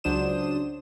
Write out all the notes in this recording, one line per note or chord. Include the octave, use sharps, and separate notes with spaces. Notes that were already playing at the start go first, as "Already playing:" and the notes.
C#2 F#3 D4 C5 D#6 E7